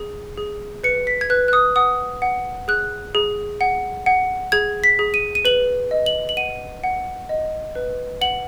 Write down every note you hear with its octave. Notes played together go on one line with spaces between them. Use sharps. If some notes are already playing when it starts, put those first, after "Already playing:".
Already playing: G#4
G#4
B4 C#7
B6
G#6
B4 F#6
F#6
D#6
F#5 D#6
F#5
G#4 F#6
G#4
F#5
F#5
G#4 G#6
B6
G#4
D#7
D#7
B4 F#7
D#5
F#7
F#7
F#5 D#7
F#5
D#5
B4
F#5 F#7